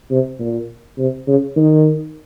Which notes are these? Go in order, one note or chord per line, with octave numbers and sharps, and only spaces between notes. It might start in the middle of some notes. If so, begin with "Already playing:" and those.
C3
A#2
C3
C#3
D#3